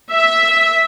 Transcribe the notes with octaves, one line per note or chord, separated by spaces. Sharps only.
E5